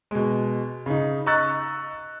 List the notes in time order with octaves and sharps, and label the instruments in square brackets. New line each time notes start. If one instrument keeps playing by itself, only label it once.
[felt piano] B2 G#3
C#3 D#4
D#5 A#5 C#6 E6 F#6 A6